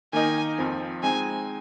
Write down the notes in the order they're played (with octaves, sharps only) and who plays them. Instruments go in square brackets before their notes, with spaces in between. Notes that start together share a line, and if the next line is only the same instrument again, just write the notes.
[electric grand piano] D#3 A#3 D#4 A#4 D#5 [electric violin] G#5
[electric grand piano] F2 F3 C4
[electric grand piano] G#3 C4 D#4 [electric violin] G#5